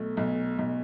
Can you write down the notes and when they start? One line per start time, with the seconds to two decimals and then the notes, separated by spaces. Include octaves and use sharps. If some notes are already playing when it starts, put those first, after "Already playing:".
Already playing: B1 A3
0.17 B1
0.59 B1